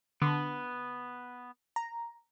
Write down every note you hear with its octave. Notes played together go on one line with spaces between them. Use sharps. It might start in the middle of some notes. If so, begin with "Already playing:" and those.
D3 B3
A#5